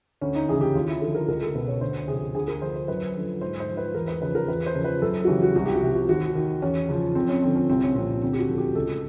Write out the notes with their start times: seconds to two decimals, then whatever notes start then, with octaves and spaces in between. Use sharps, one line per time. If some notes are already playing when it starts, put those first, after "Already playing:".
0.21 D2 C#4
0.35 D#4
0.49 C#3 E3 G#4
0.61 G4
0.75 D#2 F4
0.88 E4
1.01 D3 F3 A4
1.15 A#4
1.28 C#2 A#4
1.42 A4
1.55 B2 B4
1.68 C#5
1.81 D2 C5
2.08 C3 F3 G#4
2.34 D2 G#4
2.48 A#4
2.61 D3 F3 C5
2.76 C5
2.88 F#2 B4
3.16 D3 F3
3.41 G#2 C5
3.60 C5
3.69 F3
3.77 B4
3.95 E2 A#4
4.08 B4
4.22 C#3 F3 B4
4.35 A#4
4.48 E2 B4
4.66 C5
4.75 C#3 F3
4.84 B4
5.02 F#2 A4
5.25 F#4
5.28 C#3 E3 G4
5.42 F#4
5.56 C2 F#4
5.66 G4
5.76 F#4
5.82 C3 F3
6.09 D#2 F#4
6.35 D#3
6.62 E2 C#4
6.89 C#3 F3
7.15 F2 C4
7.29 C#4
7.42 D3 F3 C4
7.56 C#4
7.69 C2 C4
7.83 C#4
7.95 A#2 F3 C4
8.22 D2 C4
8.33 G4
8.40 F#4
8.48 D3 F3
8.58 G4
8.75 C#2 A4